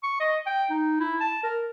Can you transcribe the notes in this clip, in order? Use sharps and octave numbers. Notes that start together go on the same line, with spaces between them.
C#6
D#5
G5
D#4
E4
A5
A#4